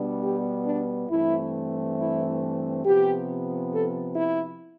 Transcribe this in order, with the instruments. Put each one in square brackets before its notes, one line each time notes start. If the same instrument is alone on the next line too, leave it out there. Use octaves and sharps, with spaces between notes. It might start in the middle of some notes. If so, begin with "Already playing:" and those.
Already playing: [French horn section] B2 G3 B3 D4
G4
D4
G2 E3 A3 C4 E4
E4
C3 F3 B3 G4
A4
E4